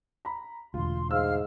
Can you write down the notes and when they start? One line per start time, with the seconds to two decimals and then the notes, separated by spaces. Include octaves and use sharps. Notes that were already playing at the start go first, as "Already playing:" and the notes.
0.25 A#5 B5
0.74 E1 D2 F4 C6
1.11 G#2 F5 E6 F6